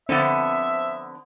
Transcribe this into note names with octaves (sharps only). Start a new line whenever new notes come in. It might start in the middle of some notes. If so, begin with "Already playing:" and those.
D3 F3 B3 C4 E5